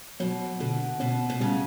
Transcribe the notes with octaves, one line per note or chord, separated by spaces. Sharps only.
B2 F#3
B2 D3
B2 C#4
B2
C#3 G3